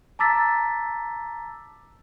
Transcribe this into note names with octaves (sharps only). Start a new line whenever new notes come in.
A5 A#5 D6 E6 A6 B6